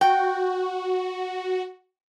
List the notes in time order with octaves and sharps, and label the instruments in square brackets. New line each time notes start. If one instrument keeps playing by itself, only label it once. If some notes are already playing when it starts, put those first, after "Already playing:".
[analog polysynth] F#4 [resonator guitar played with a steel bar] G5